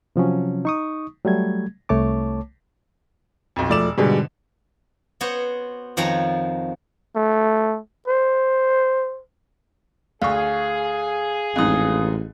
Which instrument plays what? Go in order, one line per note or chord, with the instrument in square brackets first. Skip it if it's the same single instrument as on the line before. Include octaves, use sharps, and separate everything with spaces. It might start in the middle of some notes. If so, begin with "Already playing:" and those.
[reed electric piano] C3 F3 F#3 C#4
D#4 C#6 D#6
F#3 G3 A3 G#6
C2 A3 C#5 A5 D6
[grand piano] B1 F2
[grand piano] E1 D5 E7 [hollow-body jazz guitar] F3 A3
[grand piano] G#2 B2 D3 [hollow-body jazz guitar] G3 G#4
[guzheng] B3 F#4 C5 C#5
F2 D#3 F3 F#4 C#5 A#5
[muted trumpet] A3
C5
[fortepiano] D2 C#6 [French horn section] G#4 [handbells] F5
[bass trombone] A1 [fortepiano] F2 G#2 D#4 [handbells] F5 D#6